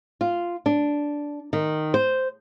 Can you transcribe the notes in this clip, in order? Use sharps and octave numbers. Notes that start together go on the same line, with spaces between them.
F4
D4
D#3
C5